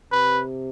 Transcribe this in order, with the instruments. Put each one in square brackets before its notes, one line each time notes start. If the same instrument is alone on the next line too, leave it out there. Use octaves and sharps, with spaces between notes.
[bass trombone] C3 [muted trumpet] B4